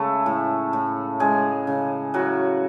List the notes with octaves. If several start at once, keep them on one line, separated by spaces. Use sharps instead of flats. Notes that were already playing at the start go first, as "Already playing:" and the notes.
Already playing: C#3 G#3 A3 A4
A2
A2
C#3 G#3 G#4
C#3
A2 F#3 F#4